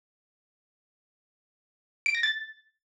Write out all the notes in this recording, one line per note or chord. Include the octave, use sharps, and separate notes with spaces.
D7
A#6
A6